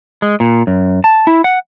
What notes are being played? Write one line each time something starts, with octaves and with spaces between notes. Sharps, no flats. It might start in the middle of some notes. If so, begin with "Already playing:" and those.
G#3
A#2
F#2
A5
E4
F#5